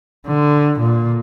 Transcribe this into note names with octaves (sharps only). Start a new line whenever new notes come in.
D3
A#2